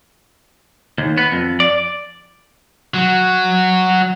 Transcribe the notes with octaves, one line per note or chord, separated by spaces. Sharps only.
D#2
B3
F2
D5
F#3